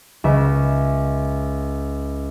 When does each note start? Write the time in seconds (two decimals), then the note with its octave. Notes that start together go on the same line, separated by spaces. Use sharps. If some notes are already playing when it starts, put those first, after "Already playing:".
0.24 C#2 E5 E7